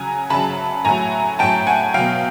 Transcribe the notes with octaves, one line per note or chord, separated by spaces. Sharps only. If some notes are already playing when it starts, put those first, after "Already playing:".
Already playing: C#3 F#3 G#5 A#5
C#3 F#3 A5 B5
A2 F#3 G#5 A#5
A2 F#3 G5 A5
F#5 G#5
B2 F#3 F5 G5